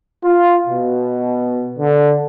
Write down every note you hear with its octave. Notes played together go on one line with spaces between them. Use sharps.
F4
B2
D3